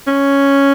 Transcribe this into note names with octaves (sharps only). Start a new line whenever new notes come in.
C#4